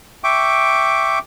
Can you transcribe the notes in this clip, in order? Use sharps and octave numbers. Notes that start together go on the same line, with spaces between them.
E5 G5 C#6 D6